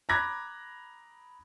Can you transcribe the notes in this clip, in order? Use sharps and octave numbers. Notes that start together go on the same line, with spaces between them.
A#5 B5 D6 F#6 G#6 A#6